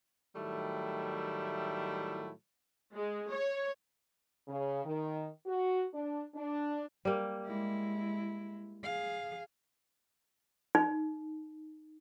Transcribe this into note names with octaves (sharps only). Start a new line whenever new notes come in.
A2 D#3 F#3 G3 A3 E4
G#3
C#5
C#3
D#3
F#4
D4
D4
G3 A#3
G#3 E4
G#4 F5
D#4